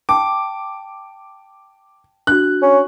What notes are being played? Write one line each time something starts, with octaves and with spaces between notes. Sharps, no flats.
G5 A5 D6
D4 F#4 F#6
C#4